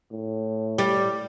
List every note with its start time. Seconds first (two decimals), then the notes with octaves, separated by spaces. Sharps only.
0.12 A2
0.78 G3